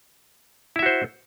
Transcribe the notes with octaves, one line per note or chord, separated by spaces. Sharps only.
E4 F#4 C5 E5